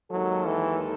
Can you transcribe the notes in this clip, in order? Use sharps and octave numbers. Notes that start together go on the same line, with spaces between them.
D#2 D#3 F#3 G#3 D#4 A4
E3